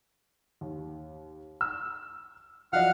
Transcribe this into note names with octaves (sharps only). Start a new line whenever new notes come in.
D#2
E6
F3 F#3 D#5 F5 F#5 F6